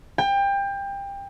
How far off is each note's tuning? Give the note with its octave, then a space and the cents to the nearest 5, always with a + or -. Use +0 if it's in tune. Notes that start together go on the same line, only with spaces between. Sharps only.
G5 +25